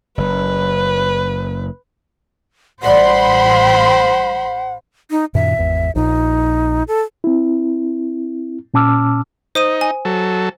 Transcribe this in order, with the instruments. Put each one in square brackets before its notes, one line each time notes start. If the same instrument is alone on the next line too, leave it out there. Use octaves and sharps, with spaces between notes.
[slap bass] F#1 [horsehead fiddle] B4
[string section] A1 B5 C6 [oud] G3 D5 D#5 [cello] C5 [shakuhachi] F#5
[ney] D#4
[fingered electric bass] F#2 A#2 D#3 [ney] E5
[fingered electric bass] G#1 E2
[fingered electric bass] A#1 A#2 [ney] D#4
[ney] A4
[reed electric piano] C4 E4
A#2 C#4 A5 D6 E6 F6
[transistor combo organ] D#4 [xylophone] C5 D#6 D#7
[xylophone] G#5
[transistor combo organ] F#3 A4